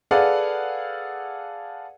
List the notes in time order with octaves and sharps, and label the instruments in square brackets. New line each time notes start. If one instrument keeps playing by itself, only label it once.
[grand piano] G#4 A4 B4 D5 F5 F#5